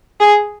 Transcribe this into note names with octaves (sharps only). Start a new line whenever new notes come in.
G#4